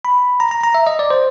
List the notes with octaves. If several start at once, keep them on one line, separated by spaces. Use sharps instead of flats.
B5
A#5
A#5
A#5
E5
D#5
D5
C5